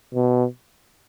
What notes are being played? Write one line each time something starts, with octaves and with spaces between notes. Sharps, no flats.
B2